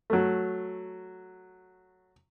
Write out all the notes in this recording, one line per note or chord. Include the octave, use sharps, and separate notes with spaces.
F#3 A3